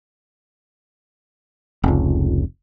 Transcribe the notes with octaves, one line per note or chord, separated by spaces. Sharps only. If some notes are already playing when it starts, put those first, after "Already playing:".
F1 C#2